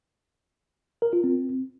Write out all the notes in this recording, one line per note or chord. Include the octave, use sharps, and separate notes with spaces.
A#4
F4
C4